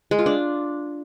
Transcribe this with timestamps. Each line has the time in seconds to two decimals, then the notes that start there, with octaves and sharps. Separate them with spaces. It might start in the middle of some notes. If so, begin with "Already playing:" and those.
0.11 G#3
0.19 F4
0.26 D4